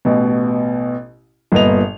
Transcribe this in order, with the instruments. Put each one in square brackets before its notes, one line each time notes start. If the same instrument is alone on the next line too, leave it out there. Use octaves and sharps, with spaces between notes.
[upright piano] A1 B2
G1 A#2 B3 D#5 F7